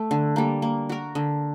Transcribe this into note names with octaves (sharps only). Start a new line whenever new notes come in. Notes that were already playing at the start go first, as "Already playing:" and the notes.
Already playing: A3
D3
G3 A#3
A#3
F#4 A#4
D3